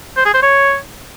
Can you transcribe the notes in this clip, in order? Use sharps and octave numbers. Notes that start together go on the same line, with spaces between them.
C5
G#4
C5
C#5